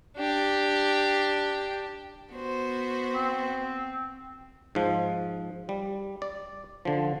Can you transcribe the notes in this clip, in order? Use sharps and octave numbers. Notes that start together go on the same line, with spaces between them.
D4 G4
B3 F#4 C5
C4
G#2 F3
G3
D5
D3 F3